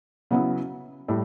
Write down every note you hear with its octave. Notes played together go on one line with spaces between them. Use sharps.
C#3 F#3 B3 E4
A2 G3